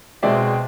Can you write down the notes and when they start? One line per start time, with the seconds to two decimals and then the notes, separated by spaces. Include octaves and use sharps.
0.23 B2 G#3 C4 D5 E5